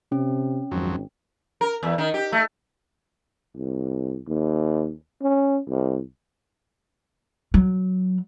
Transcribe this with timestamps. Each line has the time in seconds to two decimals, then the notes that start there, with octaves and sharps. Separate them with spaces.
0.12 C3 C#4
0.71 G#1 F2 F#3
1.61 A#4
1.83 E2
1.98 D#3
2.14 G4
2.32 A3
3.56 C2
4.27 D#2
5.22 C#4
5.67 C2
7.54 F#3